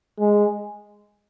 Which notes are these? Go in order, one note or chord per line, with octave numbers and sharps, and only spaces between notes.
G#3